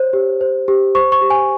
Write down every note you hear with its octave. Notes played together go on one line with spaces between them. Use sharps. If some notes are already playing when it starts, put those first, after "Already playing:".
Already playing: C5 C#5
G4
C5
G4
C5 C#6
C#6
G4
G#5